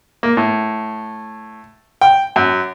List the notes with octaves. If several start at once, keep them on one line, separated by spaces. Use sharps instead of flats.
A#3
A2
G5
F#2